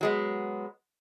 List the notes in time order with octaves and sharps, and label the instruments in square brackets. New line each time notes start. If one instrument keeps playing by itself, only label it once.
[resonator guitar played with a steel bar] F#3 G#3 B3